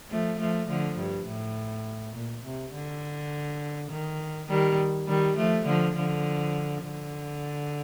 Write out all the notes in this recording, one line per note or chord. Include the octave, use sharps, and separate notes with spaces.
F3 A3
F3 A3
D3 F3
G2
A2
A#2
C3
D3
D#3
D#3 G3
D#3 G3
F3 A3
D3 F3
D3 F3
D3